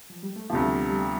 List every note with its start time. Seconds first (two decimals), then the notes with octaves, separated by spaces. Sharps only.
0.10 F3
0.23 G3
0.36 A3
0.50 D2 C3 F3 B3
0.64 G3
0.70 A3
0.90 G3